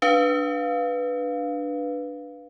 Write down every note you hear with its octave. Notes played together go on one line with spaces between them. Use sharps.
D4 B4 F5